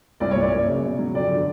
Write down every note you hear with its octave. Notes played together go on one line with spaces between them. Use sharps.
C2 D5
C#5
A#2
D5
F#2
C#3
B2
F#3
F2 D5
D3